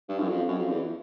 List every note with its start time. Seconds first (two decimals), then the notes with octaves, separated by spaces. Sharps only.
0.09 G2
0.19 F#2
0.29 F2
0.49 F#2
0.60 F2
0.70 E2